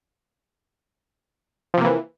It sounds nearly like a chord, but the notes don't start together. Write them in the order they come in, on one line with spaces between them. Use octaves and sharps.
F3 C3 A#3 E3